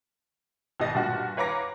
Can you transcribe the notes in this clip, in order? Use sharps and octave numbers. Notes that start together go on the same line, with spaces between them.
G#1 B2 D#5 A6 A#6
G2 A#2 F#4
B4 C#5 F5 A#5 D6 A#6